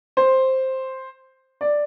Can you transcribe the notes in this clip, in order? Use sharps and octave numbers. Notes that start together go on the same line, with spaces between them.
C5
D5